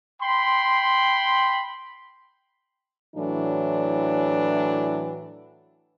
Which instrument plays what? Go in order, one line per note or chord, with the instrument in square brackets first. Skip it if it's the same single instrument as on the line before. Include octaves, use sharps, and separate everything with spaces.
[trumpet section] G5 B5 C6
[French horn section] A2 E3 F#3 D4